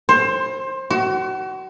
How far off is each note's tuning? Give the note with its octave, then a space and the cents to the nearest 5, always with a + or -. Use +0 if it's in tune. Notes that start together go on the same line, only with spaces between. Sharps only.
C5 +25
F#4 +35